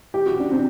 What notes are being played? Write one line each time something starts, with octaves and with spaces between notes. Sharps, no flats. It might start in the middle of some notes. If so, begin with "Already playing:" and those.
G4
F#4
D4
C4